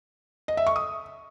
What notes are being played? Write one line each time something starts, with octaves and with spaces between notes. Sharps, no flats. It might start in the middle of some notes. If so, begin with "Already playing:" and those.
D#5
E5
C#6
D#6